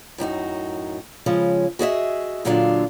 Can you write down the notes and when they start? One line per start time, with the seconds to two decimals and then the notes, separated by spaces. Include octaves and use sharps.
0.18 F#2 A2 D#4 F#4
1.26 C#3 F3 G#3 C#4
1.79 F#4 G#4 D#5 E5
2.45 A#2 D3 F#3 G#3 D4 F4